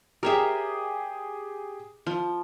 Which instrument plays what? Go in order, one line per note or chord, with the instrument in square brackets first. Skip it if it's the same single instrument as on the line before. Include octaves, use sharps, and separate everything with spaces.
[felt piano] G4 G#4 [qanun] A#4 C#5 E5
[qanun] F3